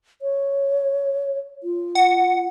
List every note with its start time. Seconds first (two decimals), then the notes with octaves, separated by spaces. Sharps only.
0.22 C#5
1.63 F4
1.95 F#5